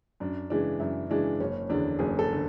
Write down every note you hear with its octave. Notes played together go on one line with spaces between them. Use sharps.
F#2 D4
C#3 E3 G#3 D4
F#2 E4
C#3 E3 G#3 D4
F#1 C#4
E2 D3 D4
F#1 G#4
A4
D3